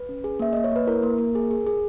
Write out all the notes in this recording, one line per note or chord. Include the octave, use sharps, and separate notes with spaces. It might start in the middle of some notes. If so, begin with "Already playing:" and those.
Already playing: B4
C#4
G#4
A#3 E5
A#3 D#5
C#5
A#3 B4
E4 A#4
A#3
A#3
G#4
G#4
G#4